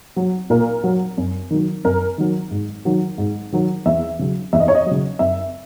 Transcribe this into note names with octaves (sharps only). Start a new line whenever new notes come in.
F#3
A#2 A#4
F#3
F#2
D#3 F#3
F#2 A#4
D#3 F#3
G#2
D#3 F#3
G#2
D#3 F#3
E2 E5
C#3 F#3
E2 E5
D#5
C#5
D#5
C#3 F#3
F#2 E5